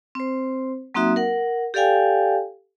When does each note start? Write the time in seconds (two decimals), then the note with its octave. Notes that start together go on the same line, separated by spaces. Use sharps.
0.15 C4 C5
0.94 F#3 A#3 C4 D#4 F#4 E5
1.16 A#4 F#5
1.74 G4 A4 D5 F5 G5 G#5